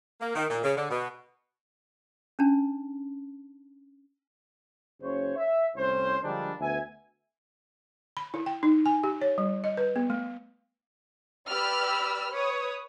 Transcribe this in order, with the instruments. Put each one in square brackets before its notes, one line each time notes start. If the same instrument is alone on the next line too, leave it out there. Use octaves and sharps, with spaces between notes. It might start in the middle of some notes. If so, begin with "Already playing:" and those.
[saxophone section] A#3
D#3
A#2
C#3
D3
B2
[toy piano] C#4 D4 A5
[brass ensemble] F#1 C#3 C5 C#5
E5
C2 A2 C#4 C5
D3 F3 G3 G#3 A#3 D4
D2 B3 E5 G#5
[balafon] B5
E4
G5
D#4
G#5
G4
C#5
G3
D#5
B4
B3
A3
[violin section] G4 B4 D5 B5 E6 F6
B4 C#5 D#6